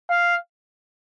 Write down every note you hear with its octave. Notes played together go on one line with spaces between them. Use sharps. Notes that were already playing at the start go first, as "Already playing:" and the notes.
F5